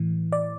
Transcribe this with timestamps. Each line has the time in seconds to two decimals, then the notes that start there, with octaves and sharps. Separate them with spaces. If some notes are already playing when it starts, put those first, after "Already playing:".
Already playing: A2 E3
0.32 D5